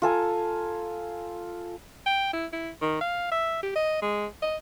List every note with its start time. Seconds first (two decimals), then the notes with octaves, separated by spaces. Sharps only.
0.02 F4 A4 G#5 A#5
2.06 G5
2.33 E4
2.53 E4
2.81 D#3
3.01 F5
3.32 E5
3.63 G4
3.75 D#5
4.02 G#3
4.42 D#5